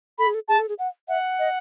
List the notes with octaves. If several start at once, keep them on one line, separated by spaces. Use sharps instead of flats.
A4 B5
G#4
A4
G#4 A5
A4
G#4
F#5
E5 F#5
D#5